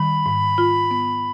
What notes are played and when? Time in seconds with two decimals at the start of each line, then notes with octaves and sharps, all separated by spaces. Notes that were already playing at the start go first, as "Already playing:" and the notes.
Already playing: D#3 G3 B5
0.26 G#2
0.58 F4
0.91 B3